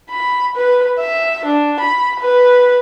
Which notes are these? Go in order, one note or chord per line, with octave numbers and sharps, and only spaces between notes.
B5
B4
E5
D4
B5
B4